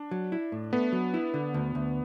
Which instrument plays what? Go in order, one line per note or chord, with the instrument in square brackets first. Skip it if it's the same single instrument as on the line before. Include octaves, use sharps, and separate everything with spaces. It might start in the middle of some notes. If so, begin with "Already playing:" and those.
Already playing: [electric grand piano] D4
[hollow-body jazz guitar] F#3
E4
A2
[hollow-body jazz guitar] A3 [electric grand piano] B3
[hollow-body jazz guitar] F#3
E4
D3
D2
D2